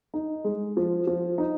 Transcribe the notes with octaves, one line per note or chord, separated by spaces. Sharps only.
D#4
G#3
F3
F3
D#4